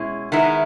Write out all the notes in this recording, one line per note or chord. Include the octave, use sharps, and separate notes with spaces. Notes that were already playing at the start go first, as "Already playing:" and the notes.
Already playing: B2 G#3 C#4 E4
D#3 G#3 B3 E4